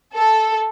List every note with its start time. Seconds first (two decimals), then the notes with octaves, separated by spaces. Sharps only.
0.14 A4